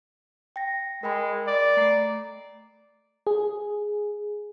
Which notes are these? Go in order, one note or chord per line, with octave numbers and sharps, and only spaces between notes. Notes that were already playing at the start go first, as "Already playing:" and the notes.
G5 A#6
G#3 A#4 G5 B5
D5
A3 A#5 C7
G#4